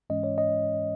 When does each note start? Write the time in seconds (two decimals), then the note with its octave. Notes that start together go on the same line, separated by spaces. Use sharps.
0.10 G#2 E3 G#3 C#4 D#5
0.23 C#5
0.38 D#5